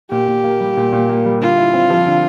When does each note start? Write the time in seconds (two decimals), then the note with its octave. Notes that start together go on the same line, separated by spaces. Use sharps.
0.11 A#2 G4
0.28 A#2
0.44 A#3
0.60 G3
0.77 A#2
0.93 A#2
1.09 A#3
1.26 G3
1.41 D3 F4
1.57 E4
1.74 C4
1.90 F3
2.06 D3